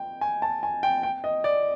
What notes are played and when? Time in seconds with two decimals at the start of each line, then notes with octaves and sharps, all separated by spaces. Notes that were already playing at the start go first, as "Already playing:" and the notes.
Already playing: G5
0.21 G#5
0.42 A5
0.63 G#5
0.83 G5
1.03 G5
1.24 D#5
1.44 D5